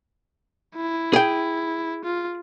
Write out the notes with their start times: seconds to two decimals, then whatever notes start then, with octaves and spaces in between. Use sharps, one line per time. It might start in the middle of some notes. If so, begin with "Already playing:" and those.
0.75 E4
1.13 G#4 G5
2.04 F4